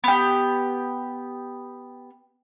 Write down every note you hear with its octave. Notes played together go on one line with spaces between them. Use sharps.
B3 G4